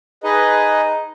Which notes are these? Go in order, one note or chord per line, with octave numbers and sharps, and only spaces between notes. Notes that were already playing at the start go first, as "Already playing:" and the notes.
D#4 G#4 B4 D#5